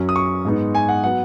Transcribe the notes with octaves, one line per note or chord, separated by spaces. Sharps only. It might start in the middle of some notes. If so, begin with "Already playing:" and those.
Already playing: F#2 F#3 C#4
D#6
C#6
G#2 G#3 B3 D#4
G#5
F#5
F#3 B3 F#5